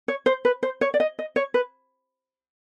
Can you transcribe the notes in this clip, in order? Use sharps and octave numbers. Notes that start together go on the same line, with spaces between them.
C#5
C5
B4
C5
C#5
D5
D#5
D#5
C#5
B4